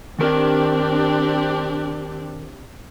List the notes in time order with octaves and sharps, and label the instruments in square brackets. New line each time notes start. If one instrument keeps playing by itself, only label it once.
[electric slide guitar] D#3 A#4 [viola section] C4 D4 G4